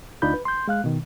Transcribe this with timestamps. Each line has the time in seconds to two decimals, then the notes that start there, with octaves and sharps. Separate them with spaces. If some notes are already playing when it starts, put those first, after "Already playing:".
0.22 D2 D4 D#4 F4 B5 G6
0.34 B4
0.45 C6 G6
0.68 G#3 F5 F#6
0.84 B2 D#3